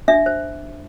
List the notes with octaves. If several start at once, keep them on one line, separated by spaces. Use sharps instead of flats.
D4 E5
C5